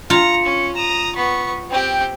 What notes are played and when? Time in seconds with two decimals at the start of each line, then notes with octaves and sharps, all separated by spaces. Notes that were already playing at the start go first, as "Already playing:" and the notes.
0.10 F4 A#5 C#7
0.45 C#4
0.76 A#5 D#6 E7
1.15 B3 C#6 B6
1.70 C4 G4 G5